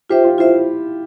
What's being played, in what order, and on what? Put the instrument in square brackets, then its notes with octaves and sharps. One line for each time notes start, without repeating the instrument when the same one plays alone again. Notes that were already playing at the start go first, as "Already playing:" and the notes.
[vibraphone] F4 C5 E5 [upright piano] G4
[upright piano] F4
[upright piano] E4 [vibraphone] F4 C5 E5